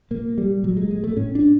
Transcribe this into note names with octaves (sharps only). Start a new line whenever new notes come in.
A#2 A#3
G3
A#2 F#3
G#3
G#3
A3
A2 C#4
D4